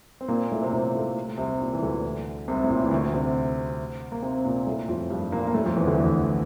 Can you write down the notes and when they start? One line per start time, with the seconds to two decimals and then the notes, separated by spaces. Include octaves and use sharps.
0.21 C4
0.28 A#2 A#3
0.51 A2 A3
0.62 C3 C4
0.73 A#2 A#3
0.87 A#3
0.94 A2 A3
1.38 C2 C3
1.61 A#2
1.73 E3
1.82 D2 D3
2.48 C2 C3
2.64 A2
2.70 A#2
2.84 E3
2.91 D2 D3
3.14 C3 C4
4.12 A#3
4.22 C3 C4
4.44 A#2 A#3
4.67 A2 A3
4.88 F2 F3
5.10 G2 G3
5.32 A#2 A#3
5.47 A#3
5.54 A2 A3
5.65 F2 F3
5.77 E2 E3
5.87 D2 D3
5.98 E2 E3